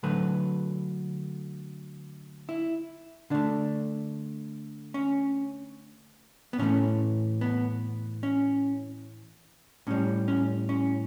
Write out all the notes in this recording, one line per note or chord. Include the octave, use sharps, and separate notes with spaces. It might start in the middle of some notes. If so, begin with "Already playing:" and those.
D3 F#3 A3 B4
E4
D3 A3 D4
C#4
B3
A2 E3 A3 C#4
B3
C#4
A2 G3 C#4
C#4
C#4